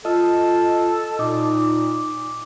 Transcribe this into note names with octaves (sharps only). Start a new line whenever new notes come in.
F4 A4 D#5
A#2 D#4 D6